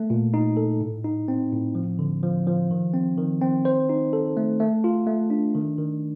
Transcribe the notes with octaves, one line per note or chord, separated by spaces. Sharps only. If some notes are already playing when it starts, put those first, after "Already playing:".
Already playing: A3
A#2
D#4
A4
A2
D#4
C4
A2
F3
D3
F3
F3
D#3
C4
D#3
C4
C5
D#4
A4
A3
A3
F4
A3
D4
D#3
D#3